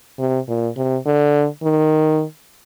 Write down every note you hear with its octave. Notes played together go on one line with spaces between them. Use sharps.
C3
A#2
C3
D3
D#3